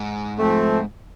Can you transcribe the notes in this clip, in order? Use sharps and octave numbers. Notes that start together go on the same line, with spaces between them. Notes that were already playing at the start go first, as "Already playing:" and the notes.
Already playing: G#2
F3 A3 C4